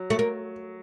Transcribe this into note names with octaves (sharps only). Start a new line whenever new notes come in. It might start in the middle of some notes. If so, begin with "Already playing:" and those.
Already playing: F#3
A3
A#3